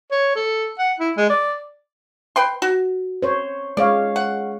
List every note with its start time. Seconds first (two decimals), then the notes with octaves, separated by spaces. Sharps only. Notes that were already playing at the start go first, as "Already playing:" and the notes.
0.11 C#5
0.36 A4
0.79 F#5
1.00 E4
1.17 G#3
1.30 D5
2.36 B4 G5 C6
2.62 F#4
3.22 C5 C#5
3.77 G#3 C#5 D5 F5
4.16 F#5